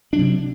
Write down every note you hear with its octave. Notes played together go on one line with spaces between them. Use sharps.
C3 F#3 D4